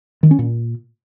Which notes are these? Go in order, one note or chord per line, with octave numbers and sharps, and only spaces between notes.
D#3
C#4
A#2